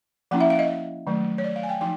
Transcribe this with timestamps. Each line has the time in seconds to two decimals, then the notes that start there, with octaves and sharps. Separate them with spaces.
0.31 F3 A#3 C#4 E4 F#5
0.41 E5
0.50 F5
0.59 D#5
1.07 D#3 F#3 A3
1.38 C#5
1.44 D5
1.56 F5
1.63 G#5
1.69 G5
1.81 F3 D#4 G5